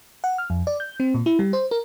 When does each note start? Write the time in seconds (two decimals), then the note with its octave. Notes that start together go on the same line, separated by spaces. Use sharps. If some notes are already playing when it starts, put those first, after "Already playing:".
0.24 F#5
0.38 F6
0.50 F2
0.67 D5
0.80 G6
1.00 C4
1.14 A#2
1.26 E4
1.39 G3
1.53 C5
1.71 A#4